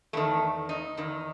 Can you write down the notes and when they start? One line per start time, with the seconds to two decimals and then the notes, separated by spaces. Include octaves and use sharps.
0.13 E2 D#3 A3
0.69 D#4
0.97 E2 D#3